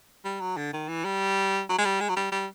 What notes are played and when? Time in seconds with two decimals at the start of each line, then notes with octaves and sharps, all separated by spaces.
0.25 G3
0.41 F#3
0.57 D3
0.73 D#3
0.88 E3
1.05 G3
1.69 F#3
1.78 G#3
1.85 G3
2.00 G#3
2.09 F#3
2.16 G3
2.32 G3